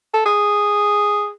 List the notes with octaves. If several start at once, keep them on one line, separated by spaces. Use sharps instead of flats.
A4
G#4